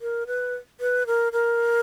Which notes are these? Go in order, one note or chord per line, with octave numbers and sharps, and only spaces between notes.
A#4
B4
B4
A#4
A#4